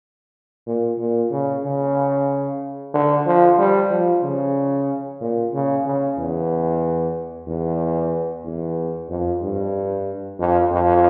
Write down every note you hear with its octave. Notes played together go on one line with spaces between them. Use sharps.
A#2
A#2
C#3
C#3
D3
F3
G3
F3
C#3
A#2
C#3
C#3
E2
E2
E2
F2
G2
F2
F2